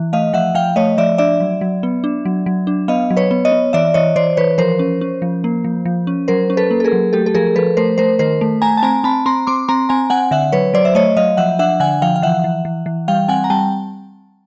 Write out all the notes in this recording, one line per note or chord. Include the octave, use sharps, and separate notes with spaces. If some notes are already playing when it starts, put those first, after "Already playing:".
Already playing: E3
A3 D#5 F5
F3 E5 F#5
F3 F5 G5
A3 C#5 D#5
F3 D5 E5
D4 D5 E5
F#3
F#3
B3
D4
F#3
F#3
D4
B3 D#5 F5
F#3
B4 C#5
B3
C#5 D#5
B3
E3 D5 E5
E3 C#5 D#5
E3 C5 D5
E3 B4 C#5
F3 A#4 C5
C#4
C#4
F3
A#3
F3
F3
C#4
F#3 A#4 C5
C#4
A4 B4
A#3
A4
G#4 A#4
F#3
A3 G4 A4
A4
F3 G#4 A#4
F3 A4 B4
A3 A#4 C5
A3 A#4 C5
D#3 A#4 C5
A3
A3 G#5 A#5
A5
C4 G#5 A#5
C4 A5 B5
C4 A#5 C6
C4 C6 D6
C4 A#5 C6
C4 G#5 A#5
C4 F#5 G#5
D3 E5 F#5
F#3 B4 C#5
F#3 C5 D5
E5
A3 C#5 D#5
F#3 D#5 F5
F3 E5 F#5
D4 E5 F#5
D3 F#5 G#5
F3 F5 G5
F5
E3 E5 F#5
E3
E3
E3
G3 F5 G5
C4 F#5 G#5
A#5
G3 G5 A5